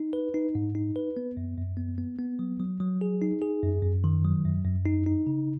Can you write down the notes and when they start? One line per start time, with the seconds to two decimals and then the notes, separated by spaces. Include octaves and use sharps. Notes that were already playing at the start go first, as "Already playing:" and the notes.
Already playing: D#4
0.13 B4
0.34 D#4
0.55 G#2
0.75 D#4
0.96 B4
1.17 B3
1.37 F#2
1.58 F#2
1.77 B3
1.98 B3
2.19 B3
2.39 F#3
2.60 F#3
2.80 F#3
3.01 G#4
3.22 D#4
3.42 G#4
3.63 F#2
3.83 F#2
4.04 D#3
4.25 F#3
4.45 F#2
4.65 F#2
4.85 D#4
5.07 D#4
5.27 C#3